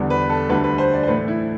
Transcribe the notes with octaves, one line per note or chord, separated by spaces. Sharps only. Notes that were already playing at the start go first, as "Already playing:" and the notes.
Already playing: E2 D3 G3
B4
A4
D2 D3 G3 B4
B4
C5
D5
C5
A2 E3 A3 B4
E4